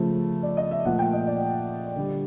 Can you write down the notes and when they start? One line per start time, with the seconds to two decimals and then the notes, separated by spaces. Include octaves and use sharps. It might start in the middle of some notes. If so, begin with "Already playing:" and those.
Already playing: C#3 F3 A3
0.43 D5
0.57 D#5
0.71 E5
0.85 A#2 F3 A3 F#5
0.99 G5
1.13 D#5
1.27 D5
1.96 D3 G3